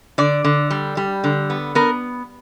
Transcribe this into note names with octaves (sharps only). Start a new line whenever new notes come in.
D3 D5
D3
G3
G3
D3
B3
B3 A#4